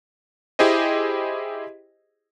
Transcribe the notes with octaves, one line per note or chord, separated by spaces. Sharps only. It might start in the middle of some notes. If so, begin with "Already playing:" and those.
E4 G4 G#4 C5 D#5